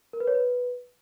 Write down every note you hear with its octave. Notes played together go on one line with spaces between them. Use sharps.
A#4
B4
C#5
B4